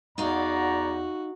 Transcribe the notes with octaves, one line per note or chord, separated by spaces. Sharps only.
E2 D#4 F#4 D5 F5 A#5